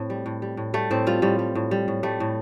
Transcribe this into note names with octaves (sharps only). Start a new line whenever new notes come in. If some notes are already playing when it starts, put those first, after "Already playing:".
Already playing: A2 A3 C4
G3
A2
G3
A2
G3 A3
A2 C4
G3 F4
A2 G3
G3
A2
G3
A2
G3 A3
A2